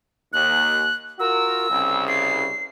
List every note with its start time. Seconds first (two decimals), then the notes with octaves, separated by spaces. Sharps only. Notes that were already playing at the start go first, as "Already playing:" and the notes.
0.33 D#2 F#6
1.19 F4 F#4 A#4 E6
1.70 C2 C#3
2.08 C7